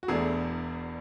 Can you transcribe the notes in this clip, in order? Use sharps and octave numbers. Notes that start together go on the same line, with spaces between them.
F#4
E1 E2 B2 A3 D4 G#4